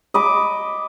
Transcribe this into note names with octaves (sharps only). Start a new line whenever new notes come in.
D#5 B5 D6